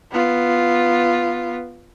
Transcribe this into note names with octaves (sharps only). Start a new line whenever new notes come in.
B3 F4